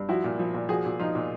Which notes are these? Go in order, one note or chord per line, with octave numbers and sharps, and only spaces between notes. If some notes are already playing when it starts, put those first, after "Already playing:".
Already playing: G2
F3 E4 F#4
A#2
F3
A#2
F3 F#4 G#4
A#2
F3 D#4 F4
A#2